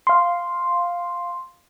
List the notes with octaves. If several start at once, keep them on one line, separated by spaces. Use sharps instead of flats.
F5 C6